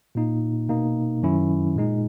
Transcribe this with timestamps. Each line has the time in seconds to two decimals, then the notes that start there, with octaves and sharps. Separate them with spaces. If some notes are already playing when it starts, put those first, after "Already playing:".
0.15 A#2 A#3 D#4
0.69 B2 A#3 D#4
1.22 F#2 D#3 F#3 C#4 E4
1.76 A#2 G#3 D#4